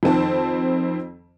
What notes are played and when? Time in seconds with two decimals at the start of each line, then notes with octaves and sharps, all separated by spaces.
0.03 F2 D#3 C4 A5